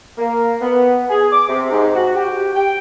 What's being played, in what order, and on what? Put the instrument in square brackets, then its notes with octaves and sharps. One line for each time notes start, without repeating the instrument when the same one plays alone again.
[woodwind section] A#3
B3
G#4
D6
C3
G#2
F#4
G4
G5